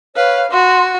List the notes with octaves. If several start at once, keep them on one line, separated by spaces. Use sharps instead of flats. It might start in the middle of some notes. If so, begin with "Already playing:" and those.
B4 C#5 F5
F#4 C6